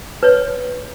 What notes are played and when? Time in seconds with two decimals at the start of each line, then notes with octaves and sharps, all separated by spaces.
0.23 B4 C#5